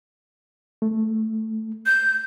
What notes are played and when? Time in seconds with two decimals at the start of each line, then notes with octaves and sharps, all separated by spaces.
0.82 A3
1.86 G6